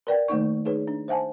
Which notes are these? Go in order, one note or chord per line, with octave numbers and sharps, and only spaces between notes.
A#4 B4 D5 F#5 G5
D#3 A3 A#3 D#4 C#6
D#4 G#4 B4 C#5
D4
C5 E5 F#5 G#5 A5